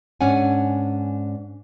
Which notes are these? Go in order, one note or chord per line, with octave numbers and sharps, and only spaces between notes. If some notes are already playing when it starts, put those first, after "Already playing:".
G#2 C#4 D4 F#5 G#5